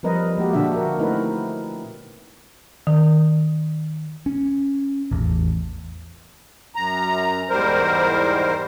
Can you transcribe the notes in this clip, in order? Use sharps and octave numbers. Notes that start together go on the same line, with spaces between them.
F3 G3 C4 A#4 B4 D#5
G#3 A#3 F#4 G4
A#2 D3 A#3 D4 F#4 E5
F#4 A#4
A3 C4 D#4 E4 A#4 B4
D#3
C#4
A1 E2
F#2 A#5
E2 G#2 G3 A#4 C5